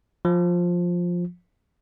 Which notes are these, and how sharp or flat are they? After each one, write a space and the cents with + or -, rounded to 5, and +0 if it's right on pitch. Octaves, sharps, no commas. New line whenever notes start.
F3 +10